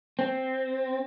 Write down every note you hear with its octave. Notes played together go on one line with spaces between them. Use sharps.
C4